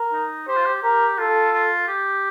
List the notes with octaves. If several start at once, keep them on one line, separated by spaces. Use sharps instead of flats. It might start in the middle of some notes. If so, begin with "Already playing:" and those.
Already playing: A#4
D#4
G4 C5
F4
G4
G4 A#4
F4 A4
F4
G4